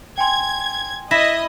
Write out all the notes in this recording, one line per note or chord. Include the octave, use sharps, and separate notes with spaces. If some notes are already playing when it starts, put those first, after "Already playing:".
G5 G#5 C6 G#6
E4 D#5 A#6 B6 E7